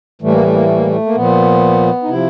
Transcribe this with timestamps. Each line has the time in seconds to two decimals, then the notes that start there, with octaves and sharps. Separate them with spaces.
0.22 A2 E3 G3 A3
0.32 A#3
0.43 A3
0.53 A#3
0.65 A3
0.75 A#3
0.86 A3
1.06 A#3
1.15 A#2 F3 B3
2.03 D#4
2.08 C3 F3 E4